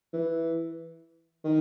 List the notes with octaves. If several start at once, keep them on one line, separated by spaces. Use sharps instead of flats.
E3
D#3